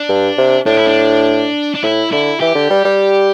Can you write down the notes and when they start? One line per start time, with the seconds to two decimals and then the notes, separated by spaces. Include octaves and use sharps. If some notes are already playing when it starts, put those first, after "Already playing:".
Already playing: D4
0.09 G2
0.38 C3
0.66 A2 D4
0.77 E4
0.86 D4
1.75 D4
1.83 A2 E4
2.12 D3 E4
2.41 E3 G4
2.55 D3
2.70 G3
2.85 G3